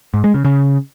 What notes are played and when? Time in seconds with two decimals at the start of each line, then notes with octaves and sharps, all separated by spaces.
0.14 G#2
0.24 G#3
0.34 C#3
0.45 C#3